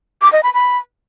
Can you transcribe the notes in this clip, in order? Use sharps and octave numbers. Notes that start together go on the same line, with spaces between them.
D6
D#5
B5
B5